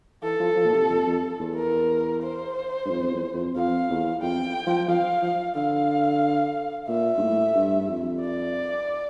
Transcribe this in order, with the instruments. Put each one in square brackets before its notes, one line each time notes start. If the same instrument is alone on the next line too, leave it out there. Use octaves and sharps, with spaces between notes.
[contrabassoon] E3 [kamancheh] A4
[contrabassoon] F3
F3
A#2
C3
F2
F2
E2
[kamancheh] A#4
C5
[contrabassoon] G2
F2
F2
E2
F2
[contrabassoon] F2 [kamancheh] F5
[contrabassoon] E2
[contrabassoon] F2 [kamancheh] G5
[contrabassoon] F3
[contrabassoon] F3 [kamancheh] F5
[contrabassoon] F3
[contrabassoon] D3 [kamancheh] F5
[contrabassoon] A#2 [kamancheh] E5
[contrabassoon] G2
A2
G2
G2
F2
[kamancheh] D5